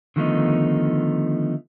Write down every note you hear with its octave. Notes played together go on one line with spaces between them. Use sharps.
D3 D#3 F3 A3 B3 D#4